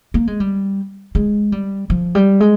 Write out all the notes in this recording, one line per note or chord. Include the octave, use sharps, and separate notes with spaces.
A#3
G#3
G3
G#3
G3
F3
G3
G#3